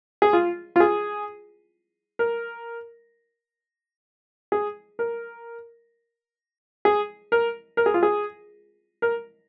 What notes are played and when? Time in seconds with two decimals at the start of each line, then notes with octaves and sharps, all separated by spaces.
0.22 G#4
0.33 F4
0.76 F4
0.80 G#4
2.19 A#4
4.52 G#4
4.99 A#4
6.85 G#4
7.32 A#4
7.77 A#4
7.86 G#4
7.94 F4
8.03 G#4
9.02 A#4